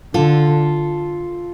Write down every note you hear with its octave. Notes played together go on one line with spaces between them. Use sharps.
D3 F4 A4